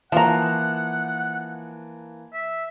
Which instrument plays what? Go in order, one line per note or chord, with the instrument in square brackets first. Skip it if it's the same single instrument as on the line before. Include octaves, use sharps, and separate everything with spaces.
[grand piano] E3 A#3 A5 [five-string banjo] F3 A#5 [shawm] F#5
[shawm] E5